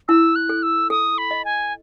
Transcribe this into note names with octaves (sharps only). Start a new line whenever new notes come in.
E4 E6
F#6
A4
E6
A4 D#6
B5
D#5
G#5